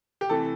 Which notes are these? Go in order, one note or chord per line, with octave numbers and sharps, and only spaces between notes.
G4
C3 E3 A3 A4